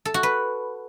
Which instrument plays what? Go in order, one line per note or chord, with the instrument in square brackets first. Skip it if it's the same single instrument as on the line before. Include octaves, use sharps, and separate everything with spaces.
[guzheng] A4
F#4
B4